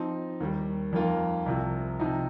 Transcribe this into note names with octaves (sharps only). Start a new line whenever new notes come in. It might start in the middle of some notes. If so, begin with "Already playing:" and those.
Already playing: F3 C4 D#4
D#2 D#3 G3
F2 D#3 A#3 F4
C2 C3 F3
C3 F3 D#4